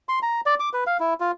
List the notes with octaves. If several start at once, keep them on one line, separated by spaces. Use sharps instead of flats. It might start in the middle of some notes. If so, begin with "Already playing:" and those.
C6
A#5
D5
D6
B4
F5
E4
F4